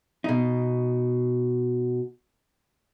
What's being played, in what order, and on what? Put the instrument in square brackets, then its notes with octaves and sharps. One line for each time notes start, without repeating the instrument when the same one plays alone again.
[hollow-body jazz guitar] B2 D#4